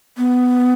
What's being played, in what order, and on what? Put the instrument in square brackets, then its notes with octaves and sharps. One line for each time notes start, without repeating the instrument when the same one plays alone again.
[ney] B3